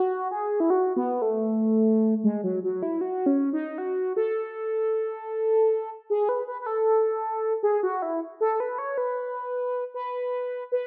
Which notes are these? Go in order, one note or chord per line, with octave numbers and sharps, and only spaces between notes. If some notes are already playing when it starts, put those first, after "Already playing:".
Already playing: F#4
G#4
E4
F#4
B3
A3
G#3
F#3
F#3
E4
F#4
C#4
D#4
F#4
A4
G#4
B4
B4
B4
A4
G#4
F#4
E4
A4
B4
C#5
B4
B4
B4